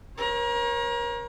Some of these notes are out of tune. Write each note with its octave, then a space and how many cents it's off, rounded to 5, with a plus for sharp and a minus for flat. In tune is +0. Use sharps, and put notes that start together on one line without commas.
A#4 +35 C#5 -35